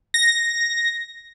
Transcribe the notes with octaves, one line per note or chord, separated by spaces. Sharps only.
A#6